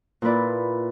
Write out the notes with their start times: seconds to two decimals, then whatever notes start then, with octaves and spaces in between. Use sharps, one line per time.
0.22 A#2 A#3 E4 B4 D5